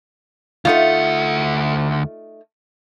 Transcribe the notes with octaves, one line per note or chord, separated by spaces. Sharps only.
D2 A3 D#4 F4 F#5